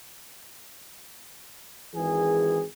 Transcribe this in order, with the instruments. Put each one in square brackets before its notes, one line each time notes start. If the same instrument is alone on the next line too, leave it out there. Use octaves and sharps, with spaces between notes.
[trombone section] G#1 E3 G#4